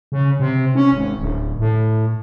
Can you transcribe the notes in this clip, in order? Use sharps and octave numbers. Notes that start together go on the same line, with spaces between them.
C#3
C3
C#4
G#1
D1
A2